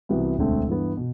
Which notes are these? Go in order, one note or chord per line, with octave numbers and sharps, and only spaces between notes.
C2 C3 E3 B3 F#4
E1 D2 D3 A3 C4
G2 E3 B3
B2